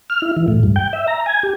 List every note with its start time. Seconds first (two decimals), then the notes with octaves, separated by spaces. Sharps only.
0.10 F6
0.22 E4
0.36 E3
0.48 A2
0.63 G2
0.76 G5
0.93 E5
1.07 A#5
1.26 G#5
1.43 G4